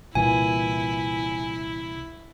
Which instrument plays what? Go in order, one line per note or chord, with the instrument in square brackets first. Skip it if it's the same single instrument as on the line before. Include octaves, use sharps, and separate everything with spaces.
[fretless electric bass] C2 A#2 E3 [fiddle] E4 [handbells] G#5